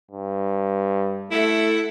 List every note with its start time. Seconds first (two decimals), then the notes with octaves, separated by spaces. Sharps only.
0.11 G2
1.31 A3 E4 A4 E5 F#5